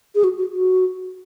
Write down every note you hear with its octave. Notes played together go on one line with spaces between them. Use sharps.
G#4
F#4
F#4
F#4